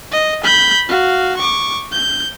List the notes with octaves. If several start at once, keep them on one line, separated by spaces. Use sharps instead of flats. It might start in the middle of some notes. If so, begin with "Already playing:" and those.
D#5
B5 G6
F#4 F5
C#6 D6
G6